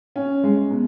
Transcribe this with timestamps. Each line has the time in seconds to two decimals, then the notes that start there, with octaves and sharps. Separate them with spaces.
0.16 C#4
0.44 G#3
0.70 B2